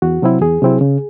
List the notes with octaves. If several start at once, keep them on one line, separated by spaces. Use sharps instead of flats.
E2 F#4
C3 F#3 C4 E4
E2 G#4
C3 F#3 C4 E4
C#3